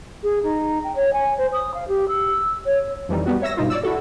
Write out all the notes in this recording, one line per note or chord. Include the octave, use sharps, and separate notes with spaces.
G#4
D#4
G5
C#5
G#5
C5
D#6
F5
G4
E6
C#5
F2 E3 G3 D#4
G3 B3 F#4
C#5 E5 E6 A#6
G2 B2 D#4 F4
C#5 D5 E6
E4 F#4 A4